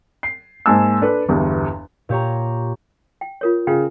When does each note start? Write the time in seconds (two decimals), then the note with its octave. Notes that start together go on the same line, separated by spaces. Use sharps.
0.23 C7
0.66 G#2 A#3 G#5 A5 E6
1.02 D4 A4 B4
1.29 G1 E2 G2
2.09 A#2 G4 C#5 A#5
3.21 G5
3.41 F4 A#4 C#5
3.67 C#3 F4 G5